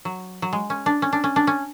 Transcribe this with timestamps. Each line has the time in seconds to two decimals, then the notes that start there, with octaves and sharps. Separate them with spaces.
0.05 F#3
0.42 F#3
0.53 G#3
0.70 C#4
0.86 D4
1.02 C#4
1.13 D4
1.24 C#4
1.36 D4
1.47 C#4